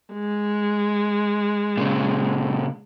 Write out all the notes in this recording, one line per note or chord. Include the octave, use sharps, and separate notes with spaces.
G#3
A#2 C#3